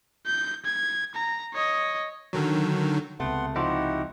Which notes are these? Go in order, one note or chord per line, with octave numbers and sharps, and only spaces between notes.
G6
G#6
A#5
C#5 D#5
D3 D#3 F#3
C#2 C3 A3 B3 F#5 C6
F3 D#4 E4 F#4 G4 F#5